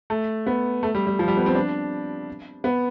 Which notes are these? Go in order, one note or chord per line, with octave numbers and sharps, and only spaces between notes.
A3
B3
A3
G3
G3
F3
G3
B3
C4
D4
B3